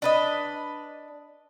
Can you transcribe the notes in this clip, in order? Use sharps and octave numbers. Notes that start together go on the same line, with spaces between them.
D4 B4 D#5